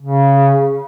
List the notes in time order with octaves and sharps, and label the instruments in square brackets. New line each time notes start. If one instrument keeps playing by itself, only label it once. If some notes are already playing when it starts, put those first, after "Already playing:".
[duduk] C#3